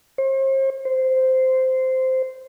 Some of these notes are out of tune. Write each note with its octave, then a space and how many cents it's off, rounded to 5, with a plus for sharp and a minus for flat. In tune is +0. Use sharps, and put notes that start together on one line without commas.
C5 +40
C5 -10